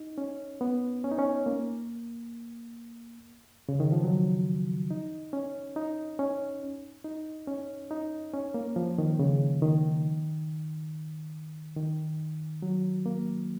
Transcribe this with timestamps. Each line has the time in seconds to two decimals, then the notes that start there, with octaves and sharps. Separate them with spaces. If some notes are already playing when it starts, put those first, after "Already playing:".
Already playing: D#4
0.18 C#4
0.61 B3
1.04 C#4
1.11 D#4
1.19 C#4
1.46 A#3
3.69 C#3
3.80 D#3
3.92 F3
4.04 F#3
4.91 D#4
5.33 C#4
5.76 D#4
6.19 C#4
7.04 D#4
7.48 C#4
7.91 D#4
8.34 C#4
8.54 A#3
8.76 F3
8.98 D#3
9.19 C#3
9.62 D#3
11.77 D#3
12.62 F#3
13.06 A#3